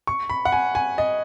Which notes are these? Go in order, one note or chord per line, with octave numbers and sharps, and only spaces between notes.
C#6
B5
F#5
G#5
G#5
D#5